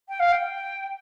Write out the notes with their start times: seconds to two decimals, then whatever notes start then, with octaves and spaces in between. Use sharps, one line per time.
0.08 G5
0.19 F5
0.32 G5